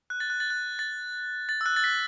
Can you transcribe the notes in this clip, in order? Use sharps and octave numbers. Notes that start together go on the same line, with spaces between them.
F#6
A6
F#6
A6
F#6
A6
A6
E6
F#6
A6
B6